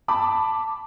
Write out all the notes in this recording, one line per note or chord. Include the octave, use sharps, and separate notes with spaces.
A5 B5 D6